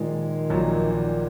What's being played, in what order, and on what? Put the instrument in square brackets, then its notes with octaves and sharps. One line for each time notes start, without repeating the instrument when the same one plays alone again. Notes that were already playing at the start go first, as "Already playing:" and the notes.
Already playing: [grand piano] A#2 F3 G#3 [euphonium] D#3
[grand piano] A#1 A#2 F#3
[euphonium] D#3